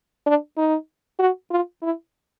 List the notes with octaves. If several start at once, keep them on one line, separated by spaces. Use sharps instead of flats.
D4
D#4
F#4
F4
E4